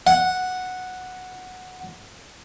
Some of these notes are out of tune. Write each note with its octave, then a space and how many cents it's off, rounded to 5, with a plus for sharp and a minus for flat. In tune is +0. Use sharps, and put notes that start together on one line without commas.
F#5 -5